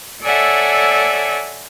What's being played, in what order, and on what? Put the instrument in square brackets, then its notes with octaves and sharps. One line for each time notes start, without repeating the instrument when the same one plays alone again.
[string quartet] A4 C#5 D5 E5 F#5 G#5